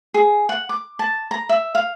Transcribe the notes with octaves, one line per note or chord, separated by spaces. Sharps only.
G#4
F#5
D6
A5
A#5
E5
F5